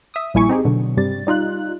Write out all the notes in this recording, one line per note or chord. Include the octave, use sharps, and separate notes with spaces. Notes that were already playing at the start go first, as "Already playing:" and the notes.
E5 D#6
A#1 G3 A#3 E4 G#5 C#6
C4 D#4 G4 G#4
B2 D3 F#3
G2 C3 G3 A6
G3 D#4 F4 F#6